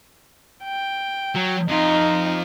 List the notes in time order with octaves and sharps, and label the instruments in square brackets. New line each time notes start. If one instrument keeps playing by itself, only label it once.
[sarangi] G5
[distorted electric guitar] F#3
[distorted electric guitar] F2 F4 [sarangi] D#4